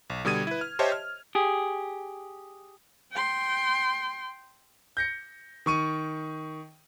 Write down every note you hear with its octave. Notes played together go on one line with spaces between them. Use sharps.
B1
B2 D3 G3 D#6 G#6 D#7
E4 B4
F6
G4 C5 C#5 D#5 E5 A5
F6
G4 G#4
G5 C6
G6 A#6 C#7
D#3 C#6 D#7